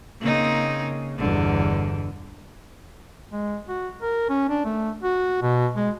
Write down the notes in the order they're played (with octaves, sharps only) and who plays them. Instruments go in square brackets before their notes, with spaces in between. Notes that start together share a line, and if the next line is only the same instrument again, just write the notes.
[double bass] C#3 [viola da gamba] A#3 C4 D#4
[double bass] G1 E2 [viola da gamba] B2 D3
[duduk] G#3
F#4
A#4
C#4
D4
A3
F#4
B2
G#3